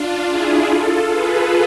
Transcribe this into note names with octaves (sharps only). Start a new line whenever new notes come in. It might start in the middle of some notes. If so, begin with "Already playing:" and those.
Already playing: D4 F4
E4 G#4
F4 A4
G#4 B4